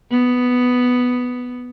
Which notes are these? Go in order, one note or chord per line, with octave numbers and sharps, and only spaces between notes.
B3